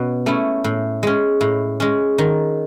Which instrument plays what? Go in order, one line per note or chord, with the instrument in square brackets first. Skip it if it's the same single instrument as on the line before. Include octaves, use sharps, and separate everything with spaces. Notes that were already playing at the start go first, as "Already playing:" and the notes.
Already playing: [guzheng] B2 C#4
A3 C#4 E4
A2
G#3 C#4
A2
G#3 C#4
D#3